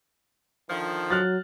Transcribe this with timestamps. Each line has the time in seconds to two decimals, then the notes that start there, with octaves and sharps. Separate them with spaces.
0.70 D3 D#3 F3
1.10 F#3 F6 F#6 A6